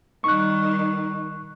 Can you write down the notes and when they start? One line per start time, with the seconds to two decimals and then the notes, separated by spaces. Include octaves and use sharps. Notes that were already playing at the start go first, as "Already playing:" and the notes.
0.24 D#3 G3 C#6 F#6